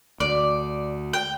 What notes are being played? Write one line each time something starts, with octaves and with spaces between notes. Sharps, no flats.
D2 D5
G5